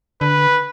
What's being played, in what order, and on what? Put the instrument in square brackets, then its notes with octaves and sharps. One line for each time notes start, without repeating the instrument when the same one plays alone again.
[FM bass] D3 [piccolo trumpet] B4